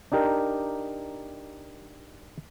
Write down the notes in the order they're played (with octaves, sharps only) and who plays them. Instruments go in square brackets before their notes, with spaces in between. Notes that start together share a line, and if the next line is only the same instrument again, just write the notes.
[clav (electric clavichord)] D4 D#4 G4 A#4